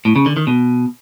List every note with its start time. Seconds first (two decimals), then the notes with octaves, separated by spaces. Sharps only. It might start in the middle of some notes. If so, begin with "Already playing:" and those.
0.05 A2
0.16 C#3
0.26 D3
0.37 D#3
0.47 B2